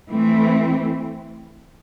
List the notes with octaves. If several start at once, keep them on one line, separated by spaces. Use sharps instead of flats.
E3 A3 C4